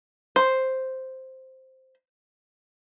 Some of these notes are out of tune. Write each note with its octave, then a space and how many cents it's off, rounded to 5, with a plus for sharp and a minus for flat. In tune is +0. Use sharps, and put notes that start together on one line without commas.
C5 +0